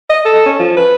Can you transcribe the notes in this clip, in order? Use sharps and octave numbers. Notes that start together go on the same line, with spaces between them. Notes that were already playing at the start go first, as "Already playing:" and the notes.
D#5
A4
C#4
F3
B4